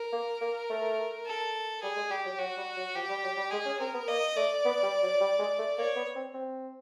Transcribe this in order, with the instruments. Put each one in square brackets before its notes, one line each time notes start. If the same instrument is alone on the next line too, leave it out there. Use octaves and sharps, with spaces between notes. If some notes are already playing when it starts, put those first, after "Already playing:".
Already playing: [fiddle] A#4
[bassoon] A#3
A#3
A3
[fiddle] A4
[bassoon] G3 [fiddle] G#4
[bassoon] G#3
[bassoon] G3 [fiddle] G4
[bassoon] F#3
[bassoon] F#3 [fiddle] F#4
[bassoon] G3
F#3
[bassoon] F3 [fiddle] G4
[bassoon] G3
F#3
G3
[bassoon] G#3 [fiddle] G#4
[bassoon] C#4
[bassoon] C4 [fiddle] A#4
[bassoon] B3
[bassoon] A#3 [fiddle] D#5
[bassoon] A3 [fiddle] D5
[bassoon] B3
G3
F#3
G3
G#3
A3
[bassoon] A#3 [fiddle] C#5
[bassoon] B3
C4
C4